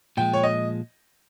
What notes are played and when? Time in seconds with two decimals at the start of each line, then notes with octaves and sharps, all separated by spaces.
0.17 A#2 F3 G#3 G5
0.33 C#5
0.43 D#5